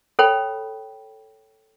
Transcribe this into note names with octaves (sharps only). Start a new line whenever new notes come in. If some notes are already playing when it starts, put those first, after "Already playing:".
A4 C#5 G5 B5